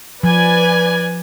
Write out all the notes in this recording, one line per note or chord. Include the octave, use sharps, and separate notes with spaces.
F3 B4 D5 G#5